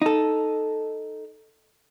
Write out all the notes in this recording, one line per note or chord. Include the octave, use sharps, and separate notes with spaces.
D#4 A4